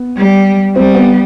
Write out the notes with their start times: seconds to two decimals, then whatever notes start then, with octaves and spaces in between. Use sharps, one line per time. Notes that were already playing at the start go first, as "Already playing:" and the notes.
Already playing: B3
0.17 G3
0.76 G3 C4
0.95 B3